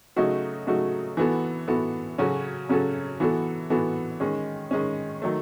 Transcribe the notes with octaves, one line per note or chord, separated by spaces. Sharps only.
C#3 F#3 A3 D#4 F#4
C#3 F#3 A3 D#4 F#4
E3 B3 F#4 A4
E3 B3 F#4 A4
C#3 F#3 C#4 F#4 A4
C#3 F#3 C#4 F#4 A4
E3 B3 F#4 A4
E3 B3 F#4 A4
D#3 G#3 C#4
D#3 G#3 C#4
D#3 F#3 A3